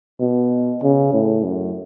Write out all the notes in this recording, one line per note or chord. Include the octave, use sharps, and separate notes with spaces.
B2
C#3
A2
F#2